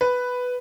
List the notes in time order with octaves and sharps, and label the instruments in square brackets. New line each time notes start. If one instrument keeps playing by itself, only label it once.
[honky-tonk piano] B4